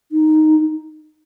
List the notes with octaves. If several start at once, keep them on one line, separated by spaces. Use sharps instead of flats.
D#4